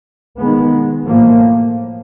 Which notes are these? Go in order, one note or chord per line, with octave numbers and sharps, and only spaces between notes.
D#3 G#3 B3
A2 F3 A#3